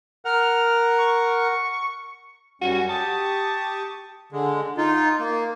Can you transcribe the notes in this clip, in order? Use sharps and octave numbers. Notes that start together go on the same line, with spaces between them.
A#4 F#5 F6
C#6
F#2 G3 C#4 F#4
G4 A5 C#6 D#6
D3 G#3
D#4 F4
A#3